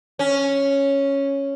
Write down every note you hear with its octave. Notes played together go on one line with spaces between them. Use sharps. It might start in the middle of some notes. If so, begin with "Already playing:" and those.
C#4